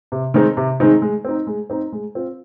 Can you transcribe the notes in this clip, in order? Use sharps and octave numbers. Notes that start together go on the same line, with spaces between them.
C3
D#3 G#3 C4 D#4
C3
D#3 G#3 C4 D#4
G#3
C4 D#4
G#3
C4 D#4
G#3
C4 F4